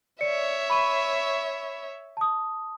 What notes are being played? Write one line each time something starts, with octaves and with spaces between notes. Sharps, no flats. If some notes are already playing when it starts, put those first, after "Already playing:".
C#5 D5 E5 C#7
B5 C#6 D#7
A5 D#6